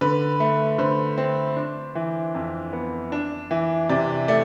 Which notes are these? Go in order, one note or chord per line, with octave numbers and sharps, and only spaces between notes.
D3 B4
A3
D3 C5
C4
D4
E3
F2
B3
D4
E3
C3 D5
A3 D5